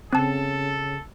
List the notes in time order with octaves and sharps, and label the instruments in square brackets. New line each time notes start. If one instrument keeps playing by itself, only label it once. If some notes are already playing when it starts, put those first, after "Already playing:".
[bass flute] C#3 [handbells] C4 A5 [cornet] A4